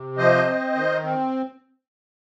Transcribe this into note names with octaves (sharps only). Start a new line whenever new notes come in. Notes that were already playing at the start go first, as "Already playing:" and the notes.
Already playing: C3
F3 C5 D#5
C4
D#3
C4